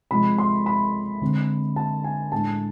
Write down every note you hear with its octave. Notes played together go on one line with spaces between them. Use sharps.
C3 F3 G#3 B5
C6
B5
D3 G#3 C4
A5
G#5
A2 G#3 D4 A5